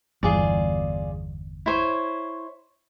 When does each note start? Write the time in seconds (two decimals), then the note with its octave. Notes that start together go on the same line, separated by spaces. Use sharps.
0.23 G1 E2 F4 G#4 D5
1.66 E4 C5 C#5